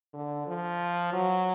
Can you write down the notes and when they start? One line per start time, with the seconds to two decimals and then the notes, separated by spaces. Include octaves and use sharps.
0.14 D3
0.47 F3
1.13 F#3